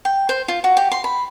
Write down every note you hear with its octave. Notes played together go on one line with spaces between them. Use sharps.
G5
C5
F4
F#4
G4
C6
B5